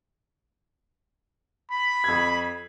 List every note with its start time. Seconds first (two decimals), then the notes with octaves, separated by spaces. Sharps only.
1.71 B5
2.04 F2 G#6